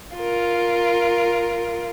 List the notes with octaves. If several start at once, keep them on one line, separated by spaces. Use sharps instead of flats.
F4 A#4